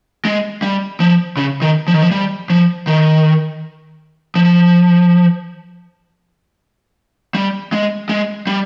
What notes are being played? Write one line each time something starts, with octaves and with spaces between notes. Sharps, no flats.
G#3
G3
F3
C#3
D#3
F3
D#3
F3
G3
F3
D#3
F3
G3
G#3
G#3
G3